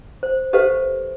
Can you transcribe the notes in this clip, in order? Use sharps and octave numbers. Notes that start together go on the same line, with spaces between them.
C5
G4 A4 B4 C5 E5 F5